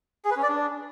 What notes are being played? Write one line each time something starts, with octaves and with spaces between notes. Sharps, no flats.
G#4
B4
C#4
D5
D4